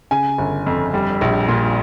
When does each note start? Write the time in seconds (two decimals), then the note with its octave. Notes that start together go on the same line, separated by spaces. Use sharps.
0.11 C#3 G#5
0.38 G1
0.66 F2
0.94 G3
1.21 A#1
1.48 A#2